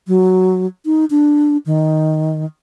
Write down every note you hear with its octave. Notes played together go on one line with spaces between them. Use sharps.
F#3
D#4
D4
D#3